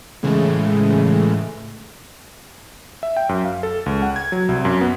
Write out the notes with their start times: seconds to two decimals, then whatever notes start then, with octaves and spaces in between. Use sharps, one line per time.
0.23 A2 C#3 E3 G#3 A3
3.03 E5
3.17 G5
3.29 F#2
3.45 F5
3.63 A4
3.86 C#2
4.02 F#5
4.16 G#6
4.32 F#3
4.49 C2
4.65 F#2
4.81 B3